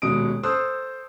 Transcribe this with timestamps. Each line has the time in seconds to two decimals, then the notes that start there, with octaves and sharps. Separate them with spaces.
0.02 D#1 B2 G#3 D#6 D7
0.43 A4 C5 C6 D#6 E6 F#6